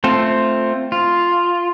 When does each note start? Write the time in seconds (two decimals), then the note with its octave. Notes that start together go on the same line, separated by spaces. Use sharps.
0.04 A3 C4 F4 A4
0.92 F4